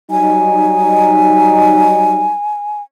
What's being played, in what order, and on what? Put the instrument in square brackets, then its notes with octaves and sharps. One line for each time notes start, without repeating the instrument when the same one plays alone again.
[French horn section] F#3 G3 D#4 [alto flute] G#5